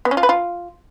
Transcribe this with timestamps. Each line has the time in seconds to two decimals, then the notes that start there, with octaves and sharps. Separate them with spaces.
0.05 B3
0.11 C#4
0.17 F4
0.23 B4
0.29 F4